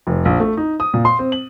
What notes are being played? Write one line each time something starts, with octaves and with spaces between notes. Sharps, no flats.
F1
A#1
A3
D#4
D#6
A#2
C6
C4
F#7